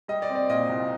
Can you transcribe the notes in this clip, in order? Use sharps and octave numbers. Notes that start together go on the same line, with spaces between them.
G3 D#5
D5
C4
D5
A#2 D#5
C2